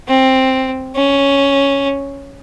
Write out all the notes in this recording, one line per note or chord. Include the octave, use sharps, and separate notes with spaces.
C4
C#4